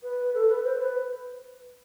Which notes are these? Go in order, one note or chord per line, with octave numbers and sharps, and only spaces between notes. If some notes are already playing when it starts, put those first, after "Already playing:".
B4
A4
B4
C5
B4